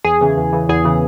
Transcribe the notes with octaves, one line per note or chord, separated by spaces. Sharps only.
E2 G#4
C#3 E3
E2
C#3 E3
E2 G#4
C#3 E3